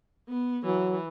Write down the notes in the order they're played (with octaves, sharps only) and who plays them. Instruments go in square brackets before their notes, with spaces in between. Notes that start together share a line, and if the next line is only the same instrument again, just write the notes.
[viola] B3
[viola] E3 [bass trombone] F#3